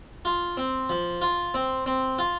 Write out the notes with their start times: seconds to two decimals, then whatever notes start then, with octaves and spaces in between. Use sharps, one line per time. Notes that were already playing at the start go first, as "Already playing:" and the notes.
0.25 F4
0.57 C4
0.89 F3
1.21 F4
1.54 C4
1.86 C4
2.18 F4